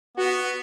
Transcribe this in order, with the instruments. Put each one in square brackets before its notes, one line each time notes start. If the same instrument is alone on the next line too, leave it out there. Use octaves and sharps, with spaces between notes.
[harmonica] B3 [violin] F#4